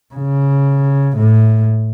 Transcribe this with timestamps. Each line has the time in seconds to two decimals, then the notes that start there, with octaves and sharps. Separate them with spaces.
0.14 C#3
1.17 A2